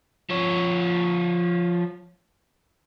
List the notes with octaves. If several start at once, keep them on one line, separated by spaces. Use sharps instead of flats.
F3 C#5